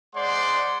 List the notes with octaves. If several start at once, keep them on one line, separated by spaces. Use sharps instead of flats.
G#3 C5 D5 F#5 C6